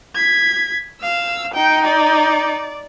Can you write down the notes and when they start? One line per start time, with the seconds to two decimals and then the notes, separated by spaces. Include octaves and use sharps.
0.15 G#6 B6
1.02 F5 E6
1.54 D#4 G5
1.85 D5